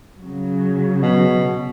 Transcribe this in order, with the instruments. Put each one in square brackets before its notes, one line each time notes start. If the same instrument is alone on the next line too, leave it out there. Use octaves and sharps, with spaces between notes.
[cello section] C#3 F#3
[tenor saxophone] B2